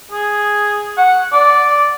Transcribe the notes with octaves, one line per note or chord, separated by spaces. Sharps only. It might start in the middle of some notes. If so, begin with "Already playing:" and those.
G#4
F#5
D5